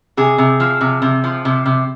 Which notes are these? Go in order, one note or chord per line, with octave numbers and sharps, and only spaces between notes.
C3 G#4
C3
F3
C3
C3
F3
C3
C3